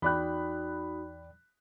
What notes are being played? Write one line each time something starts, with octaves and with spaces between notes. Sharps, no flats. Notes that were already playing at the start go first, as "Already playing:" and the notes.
E2 D#4 F#4 D5 G5 B5 F#6